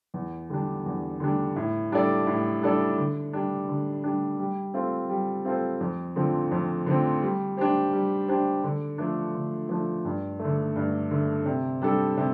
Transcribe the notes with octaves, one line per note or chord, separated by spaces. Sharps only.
E2
D3 G3 D4
E2
D3 G3 D4
A2
G3 D4 A4 D5
A2
G3 D4 A4 D5
D3
G3 D4
D3
G3 D4
G3
C4 F4 A4 C5
G3
C4 F4 A4 C5
F2
D3 F3 C4
F2
D3 F3 C4
G3
D4 G4 C5
G3
D4 G4 C5
D3
F3 A3 D4
D3
F3 A3 D4
G2
A3
D3
G2
D3 A3
C3
G3 D4 A4
C3